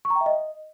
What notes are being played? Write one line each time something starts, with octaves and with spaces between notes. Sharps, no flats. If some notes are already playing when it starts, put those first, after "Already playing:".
C#6
A#5
G5
E5
D#5